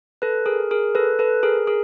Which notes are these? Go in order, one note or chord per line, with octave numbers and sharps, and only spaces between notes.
A4 B4
G#4 A#4
G#4 A#4
A4 B4
A4 B4
G#4 A#4
G#4 A#4